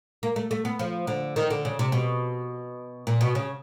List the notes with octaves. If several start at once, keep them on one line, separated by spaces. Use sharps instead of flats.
A#3
A3
A3
B3
F3
D3
D#3
D3
C#3
C3
B2
A#2
B2
C#3